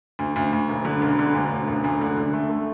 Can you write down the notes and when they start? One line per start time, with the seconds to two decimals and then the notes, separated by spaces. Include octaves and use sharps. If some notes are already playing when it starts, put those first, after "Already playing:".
0.19 D2
0.36 D2
0.53 D2
0.69 E1
0.85 D3
1.02 E1
1.19 D3
1.35 D2
1.51 E1
1.67 E1
1.84 D2
2.01 D3
2.17 D3
2.33 A3
2.50 A3